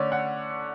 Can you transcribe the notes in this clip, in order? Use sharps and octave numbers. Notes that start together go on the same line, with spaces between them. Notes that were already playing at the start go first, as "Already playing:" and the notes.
Already playing: D3 A3 C#4 C#5 D5
F#5